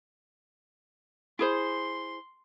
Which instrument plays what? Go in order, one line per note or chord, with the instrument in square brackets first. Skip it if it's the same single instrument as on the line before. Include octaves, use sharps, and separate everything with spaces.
[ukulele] E4 G#4 C5 [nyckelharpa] C6